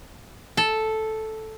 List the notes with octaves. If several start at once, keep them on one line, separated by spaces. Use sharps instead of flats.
A4